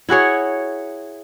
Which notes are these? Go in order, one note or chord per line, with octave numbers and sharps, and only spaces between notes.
E4 F#4 G#4 C#5